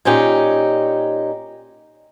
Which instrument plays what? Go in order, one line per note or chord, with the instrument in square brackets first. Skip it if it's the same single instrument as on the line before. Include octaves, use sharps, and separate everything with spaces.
[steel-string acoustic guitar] A#2 C#4 D#4 G4